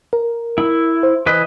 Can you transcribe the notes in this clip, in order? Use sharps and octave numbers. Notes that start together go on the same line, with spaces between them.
A#4
E4
C5
E3 B4 D#5